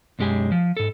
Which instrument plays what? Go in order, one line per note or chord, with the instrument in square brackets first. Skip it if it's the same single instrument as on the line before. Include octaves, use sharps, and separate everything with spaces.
[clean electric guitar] B1 F#2 G#3 G4 G#5
F3
G#2 A4